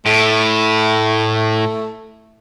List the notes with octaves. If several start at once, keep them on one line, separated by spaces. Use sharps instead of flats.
A2 A3